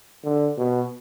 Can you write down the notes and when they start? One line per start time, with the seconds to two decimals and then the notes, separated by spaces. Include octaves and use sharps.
0.24 D3
0.58 B2